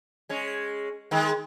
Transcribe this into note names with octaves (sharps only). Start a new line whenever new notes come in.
G#3 C#4
D#3 G#3